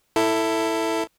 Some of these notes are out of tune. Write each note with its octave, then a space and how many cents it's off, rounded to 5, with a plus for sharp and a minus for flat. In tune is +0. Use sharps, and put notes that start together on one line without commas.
E4 +0 A4 +15